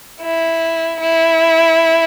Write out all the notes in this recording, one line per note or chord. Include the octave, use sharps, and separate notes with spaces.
E4
E4